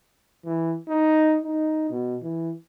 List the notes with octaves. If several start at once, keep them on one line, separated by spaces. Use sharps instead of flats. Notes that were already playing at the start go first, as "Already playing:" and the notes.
E3
D#4
D#4
B2
E3